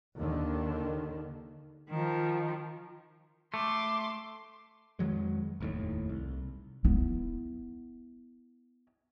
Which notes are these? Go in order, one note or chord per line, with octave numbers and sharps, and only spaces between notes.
D#2 D3 D#3
D#3 F3
A3 C6 D6
F2 D#3 F#3 G#3
F1 D#2 A2
C2
B3 E4